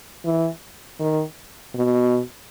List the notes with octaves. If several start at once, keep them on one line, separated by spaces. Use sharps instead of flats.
E3
D#3
B2